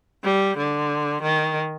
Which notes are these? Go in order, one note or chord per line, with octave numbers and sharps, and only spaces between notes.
G3
D3
D#3